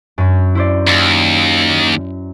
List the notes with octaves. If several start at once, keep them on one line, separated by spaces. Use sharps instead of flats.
F#2 C#4
E4 C5 D5
D#2